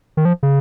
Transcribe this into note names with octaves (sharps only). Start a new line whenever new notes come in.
D#3
F3
C#3